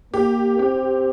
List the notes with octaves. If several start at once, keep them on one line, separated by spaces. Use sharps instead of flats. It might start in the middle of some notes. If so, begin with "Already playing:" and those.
A#3 G4
C4 G4